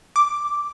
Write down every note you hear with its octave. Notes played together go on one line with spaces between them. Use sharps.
D6